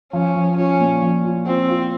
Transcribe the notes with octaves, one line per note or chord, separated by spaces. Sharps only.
F3 C#4
F3
C#4 F4
A#2
F3
F4
C4 F4
F4